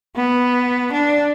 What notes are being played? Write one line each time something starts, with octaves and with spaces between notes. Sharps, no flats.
B3
D4